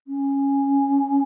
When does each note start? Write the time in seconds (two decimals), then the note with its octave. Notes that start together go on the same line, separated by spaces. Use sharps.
0.08 C#4